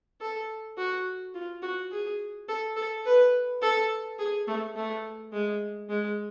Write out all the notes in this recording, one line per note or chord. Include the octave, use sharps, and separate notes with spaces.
A4
F#4
F4
F#4
G#4
A4
A4
B4
A4
G#4
A3
A3
G#3
G#3